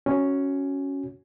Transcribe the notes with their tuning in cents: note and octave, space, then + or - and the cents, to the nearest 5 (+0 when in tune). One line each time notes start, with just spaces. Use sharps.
C#4 +0 F#4 +0